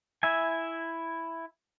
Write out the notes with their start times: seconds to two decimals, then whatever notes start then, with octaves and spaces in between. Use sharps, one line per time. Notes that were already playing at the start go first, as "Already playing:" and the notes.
0.23 E4 E5 G#5